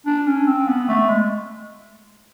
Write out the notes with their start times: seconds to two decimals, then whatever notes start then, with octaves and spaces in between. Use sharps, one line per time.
0.06 D4
0.27 C#4
0.47 C4
0.68 B3
0.89 A3
1.09 G#3